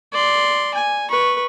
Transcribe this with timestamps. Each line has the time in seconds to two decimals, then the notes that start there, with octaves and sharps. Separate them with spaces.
0.13 D5 C6
0.75 G#5
1.10 B4 C#6